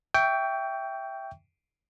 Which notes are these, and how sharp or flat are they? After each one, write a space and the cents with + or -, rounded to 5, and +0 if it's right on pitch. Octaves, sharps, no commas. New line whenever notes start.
E5 +0 G5 +0 C#6 +30